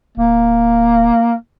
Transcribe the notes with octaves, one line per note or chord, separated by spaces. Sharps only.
D1 A#3